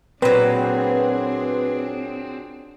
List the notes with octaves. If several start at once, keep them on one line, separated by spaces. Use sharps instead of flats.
A#2 F#3 C4 D4 G#4 B4